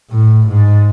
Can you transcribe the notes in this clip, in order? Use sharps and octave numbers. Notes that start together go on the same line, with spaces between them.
A2
G#2